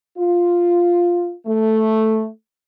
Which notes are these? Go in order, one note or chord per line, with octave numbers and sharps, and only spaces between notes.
F4
A3